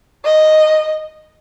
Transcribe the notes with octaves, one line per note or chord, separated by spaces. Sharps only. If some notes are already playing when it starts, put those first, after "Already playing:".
D#5